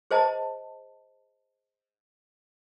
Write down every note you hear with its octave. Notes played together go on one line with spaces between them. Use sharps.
G#4 C5 D#5 A5